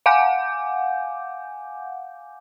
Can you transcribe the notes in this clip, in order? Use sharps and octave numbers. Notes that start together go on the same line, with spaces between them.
F5 F#5 G#5 D6 G6